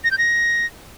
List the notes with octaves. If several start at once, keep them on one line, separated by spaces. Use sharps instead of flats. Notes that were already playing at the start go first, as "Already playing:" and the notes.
A#6
G6
A#6